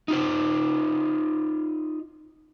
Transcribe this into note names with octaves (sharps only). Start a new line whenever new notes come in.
D#4 F4 C5